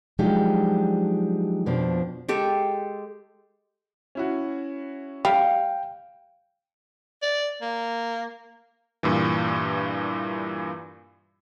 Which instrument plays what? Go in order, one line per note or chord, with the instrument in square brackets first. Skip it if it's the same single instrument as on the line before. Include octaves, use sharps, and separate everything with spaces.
[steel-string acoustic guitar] F3 F#3 G#3 D4 D#4 G4
F2 B2 F3 D4
[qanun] G#3 G4 A4
[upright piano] C#4 E4 F#4
[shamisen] G3 [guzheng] F5 [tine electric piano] G5
[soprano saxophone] D5
A#3
[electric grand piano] G2 A#2 E3